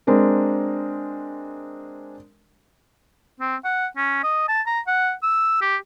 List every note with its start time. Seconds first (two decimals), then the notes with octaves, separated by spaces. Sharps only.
0.07 G#3 C4 D4 A#4
3.40 C4
3.65 F#5
3.97 C#4
4.24 D#5
4.49 A5
4.66 A#5
4.87 F#5
5.23 E6
5.62 G4